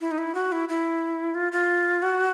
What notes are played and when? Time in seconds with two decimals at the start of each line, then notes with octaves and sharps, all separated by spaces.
0.01 E4
0.11 D#4
0.18 E4
0.35 F#4
0.52 E4
0.69 E4
1.35 F4
1.52 F4
2.02 F#4